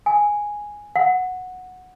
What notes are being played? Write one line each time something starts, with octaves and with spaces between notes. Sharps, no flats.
G#5
F#5